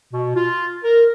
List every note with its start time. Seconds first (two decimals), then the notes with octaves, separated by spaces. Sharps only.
0.13 B2
0.35 F4
0.83 A#4